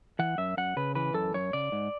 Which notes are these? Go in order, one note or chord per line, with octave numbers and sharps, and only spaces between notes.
E3 F#5
F#2 E5
F#2 F#5
C#3 B4
E3 B4
F#2 A4
F#2 C#5
C#3 D5
G#2